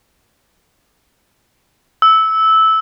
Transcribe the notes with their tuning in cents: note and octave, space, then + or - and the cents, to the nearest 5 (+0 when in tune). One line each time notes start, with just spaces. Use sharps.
E6 -15